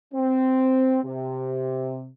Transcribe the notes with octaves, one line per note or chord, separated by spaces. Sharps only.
C4
C3